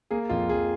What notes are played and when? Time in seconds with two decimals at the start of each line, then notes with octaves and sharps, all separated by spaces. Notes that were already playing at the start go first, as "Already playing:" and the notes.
0.11 A#3 G#4
0.29 F2 F4
0.49 F2 G#4